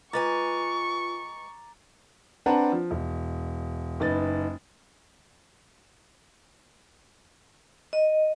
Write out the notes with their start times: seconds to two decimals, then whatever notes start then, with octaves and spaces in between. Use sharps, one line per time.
0.13 G#3 F4 B4 G#5 A#5 C#6 D6 A6
2.46 C4 D4 B4 F#5 A5 A#5
2.72 F3
2.91 E1
4.00 F#1 D#4 B4 A6
7.93 D#5